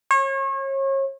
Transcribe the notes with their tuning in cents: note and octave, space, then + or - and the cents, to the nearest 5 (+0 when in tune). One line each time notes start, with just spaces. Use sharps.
C#5 -35